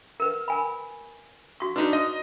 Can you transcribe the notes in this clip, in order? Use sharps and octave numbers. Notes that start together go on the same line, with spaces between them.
A#4 B4
A#4 G#5 B5
F#4 C#6
D4 D#4 F#4 B4
D#5